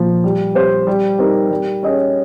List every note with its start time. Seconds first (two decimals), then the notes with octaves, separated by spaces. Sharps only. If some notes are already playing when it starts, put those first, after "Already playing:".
Already playing: A#2 F3
0.24 G3
0.55 C4 G4 C5
0.87 G3
1.18 C4 D#4 G4 A#4
1.51 G3
1.83 C#4 G#4 D#5